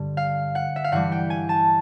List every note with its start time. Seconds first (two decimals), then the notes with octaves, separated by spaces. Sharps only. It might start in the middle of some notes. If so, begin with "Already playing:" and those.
Already playing: G2 D3 G3
0.17 F5
0.55 F#5
0.76 E5
0.84 F5
0.92 G2 E3 G3 F#5
1.12 G5
1.30 G#5
1.49 A5